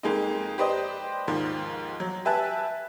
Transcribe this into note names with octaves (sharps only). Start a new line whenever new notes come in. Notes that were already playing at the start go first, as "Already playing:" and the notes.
F2 G#3 A#3 D#4
G4 B4 C5 D5 D#5
D#2 G#2 F3
F#3
G4 B4 E5 G#5 A5 F#6